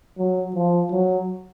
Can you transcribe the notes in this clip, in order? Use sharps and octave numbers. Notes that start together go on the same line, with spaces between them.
F#3
F3
F#3